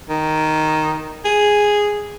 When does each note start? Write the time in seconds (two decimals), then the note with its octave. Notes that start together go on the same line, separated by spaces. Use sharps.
0.09 D#3
1.24 G#4